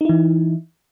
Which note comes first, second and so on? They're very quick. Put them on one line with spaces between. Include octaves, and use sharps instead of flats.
D#4 E4 E3